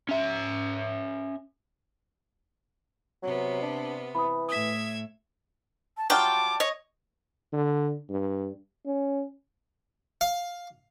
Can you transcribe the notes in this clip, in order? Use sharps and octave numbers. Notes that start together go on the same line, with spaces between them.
C#4 E5
C3 F#3 B3
D4
E3 B5 D#6
A2 E5 D#6 G#6 B6
A5
F#3 G3 F4 G5 A5 D6
C#5 D#5
D3
G2
C#4
F5